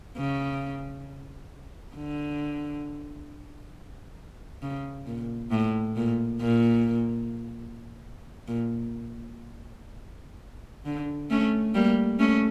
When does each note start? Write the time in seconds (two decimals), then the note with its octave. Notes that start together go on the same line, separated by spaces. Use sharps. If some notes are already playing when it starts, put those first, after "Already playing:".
0.17 C#3
1.95 D3
4.62 C#3
5.06 A#2
5.51 A2
5.96 A#2
6.41 A#2
8.48 A#2
10.86 D3
11.30 A3 C#4
11.74 G3 A#3
12.19 A3 C#4